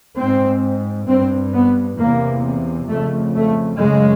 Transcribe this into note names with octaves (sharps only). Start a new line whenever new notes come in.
G#2 C4
G2 C4
B3
E2 C3 A#3
F2 C#3 A3
A3
F#2 C#3 G#3